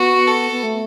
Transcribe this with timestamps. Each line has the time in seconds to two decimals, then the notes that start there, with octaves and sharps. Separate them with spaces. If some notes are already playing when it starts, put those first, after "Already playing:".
Already playing: B3 F#4
0.27 A4
0.52 B3
0.63 A3